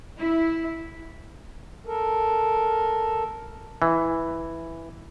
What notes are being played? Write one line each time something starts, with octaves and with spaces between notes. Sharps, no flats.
E4
A4 A#4
E3